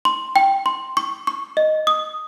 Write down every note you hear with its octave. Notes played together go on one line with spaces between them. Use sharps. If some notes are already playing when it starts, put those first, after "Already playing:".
C6
G5
C6
C#6
C#6
D#5
D#6